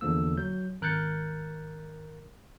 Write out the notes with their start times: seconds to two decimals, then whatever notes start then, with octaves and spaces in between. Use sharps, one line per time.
0.01 E2 D3 F3 A#3 E6
0.37 F#3 G6
0.81 G#1 A#4 F#6 G6 A6 C#7